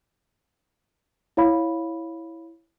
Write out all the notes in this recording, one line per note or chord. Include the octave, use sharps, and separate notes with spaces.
E4 C#5 F5 B5